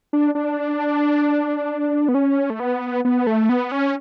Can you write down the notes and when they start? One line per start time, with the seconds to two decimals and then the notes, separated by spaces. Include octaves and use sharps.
0.13 D4
0.35 D4
2.09 B3
2.15 C#4
2.50 A3
2.60 B3
3.05 B3
3.27 A3
3.49 B3
3.72 C#4